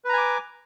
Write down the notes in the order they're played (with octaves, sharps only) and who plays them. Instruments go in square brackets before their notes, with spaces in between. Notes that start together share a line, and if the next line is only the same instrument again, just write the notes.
[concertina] B4
A#5
G#5
D6